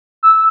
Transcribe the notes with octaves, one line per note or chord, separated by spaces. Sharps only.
E6